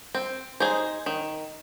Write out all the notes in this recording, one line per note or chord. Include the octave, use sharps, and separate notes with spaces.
C4
D#4 G#4 C5
D#3